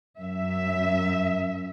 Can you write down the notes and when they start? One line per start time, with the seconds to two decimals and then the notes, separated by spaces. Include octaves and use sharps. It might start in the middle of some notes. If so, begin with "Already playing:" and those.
0.18 F#2 E5